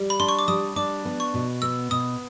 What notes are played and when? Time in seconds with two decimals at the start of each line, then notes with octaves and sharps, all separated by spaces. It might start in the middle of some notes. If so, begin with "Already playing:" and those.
Already playing: G3
0.10 B5
0.20 D4 C6
0.29 C#6
0.39 D6
0.48 G3 D#6
0.76 D4 D6
1.05 B3
1.20 C#6
1.34 B2
1.62 B3 E6
1.91 B2 D#6